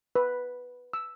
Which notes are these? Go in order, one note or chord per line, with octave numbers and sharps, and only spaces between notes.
B4
E6